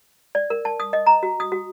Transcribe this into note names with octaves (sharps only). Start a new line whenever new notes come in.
D5
A#4
A5
D#6
D#5
A#5
F#4
D#6
F#4